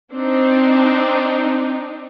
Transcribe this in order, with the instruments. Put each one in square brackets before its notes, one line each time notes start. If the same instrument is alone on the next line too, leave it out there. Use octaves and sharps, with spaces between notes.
[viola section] C4 D4 D#4